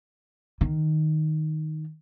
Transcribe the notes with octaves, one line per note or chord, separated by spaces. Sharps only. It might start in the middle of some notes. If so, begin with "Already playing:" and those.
D#3